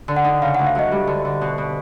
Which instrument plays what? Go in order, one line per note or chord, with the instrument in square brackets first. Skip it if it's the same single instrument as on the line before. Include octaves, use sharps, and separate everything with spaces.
[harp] D3
[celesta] F#5
[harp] D#4
[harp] C#3 [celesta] F5
[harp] D2 [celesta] F#5
[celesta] F5
[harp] F#3 [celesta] D#5
[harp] G3
D3
D3
B2
B2